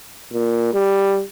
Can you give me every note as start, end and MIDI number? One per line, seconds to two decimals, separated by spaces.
0.33 0.71 46
0.74 1.22 55